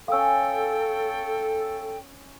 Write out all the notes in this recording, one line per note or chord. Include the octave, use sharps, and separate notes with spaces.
C#4 A4 F5 G5 D#6 E6